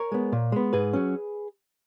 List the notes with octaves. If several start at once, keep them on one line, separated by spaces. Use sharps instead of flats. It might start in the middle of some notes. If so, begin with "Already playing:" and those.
Already playing: A#4 C#5
G#3 B3
A#2
G#3 B3
G#2 G#4 B4
F#3 C#4